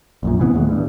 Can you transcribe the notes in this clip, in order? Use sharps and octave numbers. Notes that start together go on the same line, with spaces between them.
A#1 F#2 A#2
C3 E3 F#3 B3
D#2 A2 G#3
G2